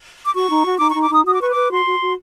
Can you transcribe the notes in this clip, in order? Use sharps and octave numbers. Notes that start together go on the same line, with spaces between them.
D6
F#4 C#6
D#4
F#4
D#4 D6
D#4 C#6
D6
D#4 D#6
F#4 D#6
D6
B4 C#6
D6
B4
F#4 C6
F#4
F#4